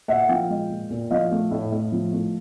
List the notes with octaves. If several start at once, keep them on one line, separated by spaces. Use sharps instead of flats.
A#2 E5 F#5
F3 F5 G5
G#3
A#2
A#2
F3 D#5 F5
A3
A2
A2
F3
A3